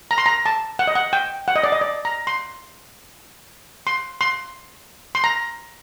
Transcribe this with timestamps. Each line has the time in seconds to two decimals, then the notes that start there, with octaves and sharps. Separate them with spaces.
0.11 A#5
0.18 C6
0.26 A#5
0.46 A5
0.79 F#5
0.87 D#5
0.95 F#5
1.13 G5
1.48 F#5
1.56 D#5
1.63 D5
1.72 D#5
1.81 D5
2.05 A#5
2.27 C6
3.87 C6
4.21 C6
5.15 C6
5.24 A#5